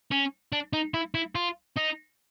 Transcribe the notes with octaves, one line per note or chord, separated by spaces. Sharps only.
C#4
D4
D#4
E4
E4
F4
D#4